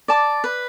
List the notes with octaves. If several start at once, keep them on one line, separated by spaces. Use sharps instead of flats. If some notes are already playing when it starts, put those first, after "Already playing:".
D5 A5 D6
B4